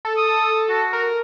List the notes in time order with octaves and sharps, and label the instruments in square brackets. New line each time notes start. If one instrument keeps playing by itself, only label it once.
[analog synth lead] A4
[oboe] D#6
F#4
[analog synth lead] A#4